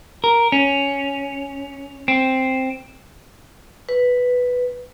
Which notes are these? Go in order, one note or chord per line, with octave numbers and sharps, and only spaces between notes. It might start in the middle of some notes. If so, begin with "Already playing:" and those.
A#4
C#4
C4
B4